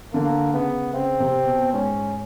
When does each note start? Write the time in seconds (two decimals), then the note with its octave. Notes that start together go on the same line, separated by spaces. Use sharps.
0.13 D3 A#3
0.53 C#3 B3
0.93 C#3 C4
1.20 C3
1.46 B2
1.73 G#2 C#4